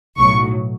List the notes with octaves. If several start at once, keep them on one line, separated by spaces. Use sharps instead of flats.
B1 A2 F#3 C#6